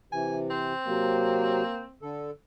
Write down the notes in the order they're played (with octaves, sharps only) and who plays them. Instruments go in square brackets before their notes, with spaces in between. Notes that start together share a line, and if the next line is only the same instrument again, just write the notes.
[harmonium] C3 E3 [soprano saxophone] G#5
[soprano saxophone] C4
[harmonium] C3 F#3 [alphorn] A#3
[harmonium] D3 A4